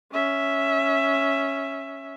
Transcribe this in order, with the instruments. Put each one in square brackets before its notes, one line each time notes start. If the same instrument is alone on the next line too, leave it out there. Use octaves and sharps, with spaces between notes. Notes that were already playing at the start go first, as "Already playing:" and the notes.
[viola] C#4 E5